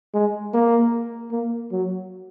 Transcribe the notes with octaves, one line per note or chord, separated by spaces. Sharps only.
G#3
A#3
A#3
F#3